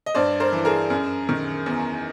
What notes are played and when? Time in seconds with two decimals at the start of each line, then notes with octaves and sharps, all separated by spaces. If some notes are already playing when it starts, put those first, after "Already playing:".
0.06 D#5
0.15 G2 C5 D5
0.40 A#4 C5
0.53 E3
0.65 G#4 A#4
0.90 F#2
1.29 D#3
1.66 E2